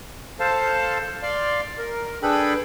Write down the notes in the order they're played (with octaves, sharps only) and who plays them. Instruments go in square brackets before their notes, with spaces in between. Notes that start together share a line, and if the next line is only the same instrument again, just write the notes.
[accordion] A4 C5 F5 A5
D5 F5 C6
A#4
D4 G#4 A4 B4 G5 B5